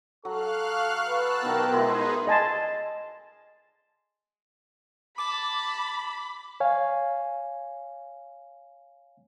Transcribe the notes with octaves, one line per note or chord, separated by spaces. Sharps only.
F#3 A4 F5 C#6 F6 F#6
B4 A5 E6 F#6
B2 D#3 F#3 B3 G4 A#4 C5
B2 G#3 D#4 E4 G#4 B4 A#5 C6
D#5 G#5 A5 C6
A5 B5 D6
C#5 F5 G#5